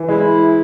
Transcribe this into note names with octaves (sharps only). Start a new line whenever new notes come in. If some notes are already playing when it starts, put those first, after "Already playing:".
Already playing: E3
G#3 E4